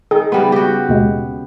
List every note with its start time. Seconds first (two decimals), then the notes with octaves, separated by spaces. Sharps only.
0.11 D#3 G#4
0.32 C#3 G3 B3 B5
0.52 F#4 G4
0.88 D#2 B2 G#3